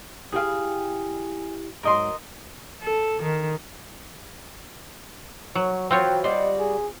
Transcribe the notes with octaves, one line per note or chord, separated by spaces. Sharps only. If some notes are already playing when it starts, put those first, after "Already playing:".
E4 G4 G#4 F5 G5
G#2 F#3 A#4 D#5 C6
A4
D#3
F#3 C#5
E3 F#3 C4 F4 C#5 G5
G3 F#4 D5 D#5 C6
G#4